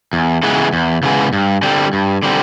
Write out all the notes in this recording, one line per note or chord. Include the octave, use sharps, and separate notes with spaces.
E2
C#3 E3 G#3 B3
E2
C#3 E3 G#3 B3
G2
D3 G3 C4
G2
D3 G3 C4